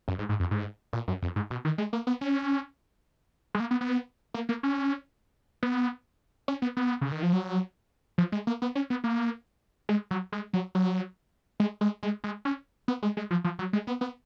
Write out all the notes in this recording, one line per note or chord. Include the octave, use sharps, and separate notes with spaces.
F#2
G#2
G#2
F2
G#2
A#2
F#2
F2
G#2
B2
D#3
G#3
A#3
B3
C#4
G#3
A#3
B3
B3
A#3
A#3
C#4
B3
C#4
B3
B3
C#3
D#3
F3
F#3
F3
G#3
A#3
B3
C#4
B3
A#3
G#3
F#3
G#3
F#3
F#3
G#3
G#3
G#3
G#3
C#4
B3
G#3
G#3
F3
F3
F#3
G#3
B3
B3